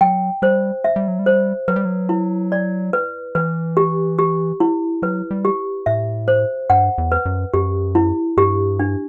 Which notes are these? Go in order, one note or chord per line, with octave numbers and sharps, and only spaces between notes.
F#3 G5
G3 C5
E5
G3
F#3
G3
C5
F#3 B4
G3
F#3
E4
D5
B4
E3 B4
G4
G4
E4
F#3 B4
G3
G4
A2 E5
C5
G2 F#5
E2
B4
F#2
F#2 G4
E4
G2 G4
D4